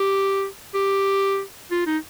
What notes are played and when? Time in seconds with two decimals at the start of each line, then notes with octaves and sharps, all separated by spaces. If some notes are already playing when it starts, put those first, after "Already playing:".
Already playing: G4
0.74 G4
1.71 F4
1.86 D#4